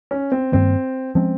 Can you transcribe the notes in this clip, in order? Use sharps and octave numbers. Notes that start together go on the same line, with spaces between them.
C#4
C4
G2 D#3 G3 A#3 C4
F3 G#3 C4 C#4